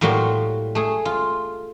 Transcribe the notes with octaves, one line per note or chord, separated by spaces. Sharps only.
A2 F#3 G3 A#3 F#4 C6
A3 G#4
F4